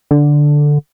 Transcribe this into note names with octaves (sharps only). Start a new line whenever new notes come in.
D3